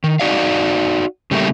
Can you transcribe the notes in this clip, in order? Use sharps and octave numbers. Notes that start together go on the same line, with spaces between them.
D#3
D#4 F#4 D5 F5
C#3 G3 A3 A#3 E4